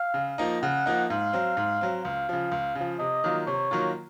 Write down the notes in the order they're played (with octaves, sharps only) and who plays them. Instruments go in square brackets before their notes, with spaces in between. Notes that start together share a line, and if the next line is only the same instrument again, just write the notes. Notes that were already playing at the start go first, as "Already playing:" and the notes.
Already playing: [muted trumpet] F5
[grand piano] C#3
F3 A#3 D#4
[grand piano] C#3 [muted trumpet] F#5
[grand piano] F3 A#3 D#4
[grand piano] G#2 [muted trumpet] F5
[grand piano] F#3 C4
G#2
F#3 C4
[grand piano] C#2 [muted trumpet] F5
[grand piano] C#3 F3
C#2
C#3
F3
[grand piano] C3 [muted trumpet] D#5
[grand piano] D#3 F#3 A#3 F4
[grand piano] C3 [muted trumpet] C#5
[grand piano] D#3 F#3 A#3 F4